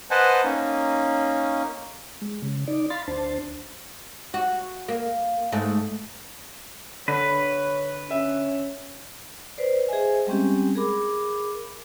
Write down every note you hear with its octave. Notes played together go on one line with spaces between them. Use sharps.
B4 C5 D#5 F#5 G#5 A5
A#3 C#4 D#4
G#3
C#3
D#4 D5
F5 B5 C6 A6
D2 D4 C5 A5
F#4
A#3
G#2 A3
D3 B4 C#5
C#4 E5
B4 C5 D5
G#4 C5 D#5 E5 G#5
G3 G#3 C4 C#4 G4
G#4 A#4 B5 D6